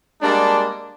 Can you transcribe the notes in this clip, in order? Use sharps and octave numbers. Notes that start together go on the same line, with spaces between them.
G3 G#3 A#3 D4